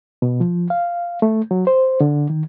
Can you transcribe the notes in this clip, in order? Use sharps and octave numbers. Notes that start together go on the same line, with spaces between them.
B2
F3
F5
A3
F#3
C5
D3
D#3